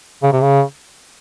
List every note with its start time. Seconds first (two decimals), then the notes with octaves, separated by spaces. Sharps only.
0.23 C#3
0.32 C3
0.41 C#3